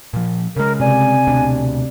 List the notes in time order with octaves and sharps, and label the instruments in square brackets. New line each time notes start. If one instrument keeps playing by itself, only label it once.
[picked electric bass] A#2 F3
[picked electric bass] C#3 G#3 [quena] A#4
[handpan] C3 D5 [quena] G#5
[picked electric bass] D2 B2 D4